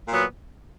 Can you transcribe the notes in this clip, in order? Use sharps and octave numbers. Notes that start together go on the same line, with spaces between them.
A#2 F#3 B3